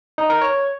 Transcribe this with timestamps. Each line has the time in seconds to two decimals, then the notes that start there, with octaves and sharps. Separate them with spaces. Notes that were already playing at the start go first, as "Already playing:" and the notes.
0.18 D#4
0.30 A#4
0.42 C#5